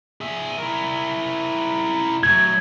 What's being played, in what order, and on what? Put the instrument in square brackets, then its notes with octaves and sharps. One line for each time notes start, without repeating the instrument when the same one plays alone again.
[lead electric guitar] G#4 E5
E4 A#4
[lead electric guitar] F#3 A3 [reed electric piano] G#6